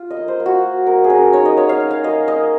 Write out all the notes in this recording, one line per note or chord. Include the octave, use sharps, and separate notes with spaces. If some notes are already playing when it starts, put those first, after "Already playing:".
Already playing: F4
D#5
A#3
C5
A#3
F#4
A#3
A#3 A#4
G#4
C#4 A#4
D#4 C#5
D#5
A#3 C#5
F5
D#4
F5
A#3 D#5
A#3 D#5